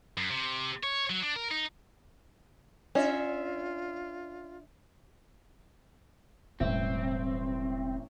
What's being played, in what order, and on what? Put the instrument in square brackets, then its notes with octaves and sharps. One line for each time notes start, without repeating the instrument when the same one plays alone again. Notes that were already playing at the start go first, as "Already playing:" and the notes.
[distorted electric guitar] F#2
C3
C#5
F#3
D4
A#4
D#4
[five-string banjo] C#4 [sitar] D4 E5 [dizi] F4
[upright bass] E1 G3 [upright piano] A1 E5 [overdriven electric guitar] C4